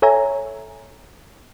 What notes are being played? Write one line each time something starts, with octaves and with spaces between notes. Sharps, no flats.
A4 C#5 E5 G#5 A#5